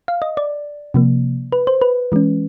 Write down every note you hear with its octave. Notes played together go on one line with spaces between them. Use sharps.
F5
D#5
D5
C3 F3 A#3
B4
C5
B4
E3 G#3 C#4